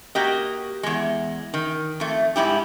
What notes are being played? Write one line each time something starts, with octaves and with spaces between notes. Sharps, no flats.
A#3 F#4 G4 D#5
E2 G#3
D#3
F2 A3
G#2 G3 E4 G4